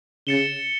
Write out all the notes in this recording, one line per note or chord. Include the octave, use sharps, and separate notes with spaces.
C#3 A6 C#7 E7 G7